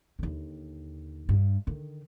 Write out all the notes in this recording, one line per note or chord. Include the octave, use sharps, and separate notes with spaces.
D#2 D3
G2
D3 D#3